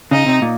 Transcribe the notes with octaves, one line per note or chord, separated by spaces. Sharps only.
C#3 D#4
C3
A#2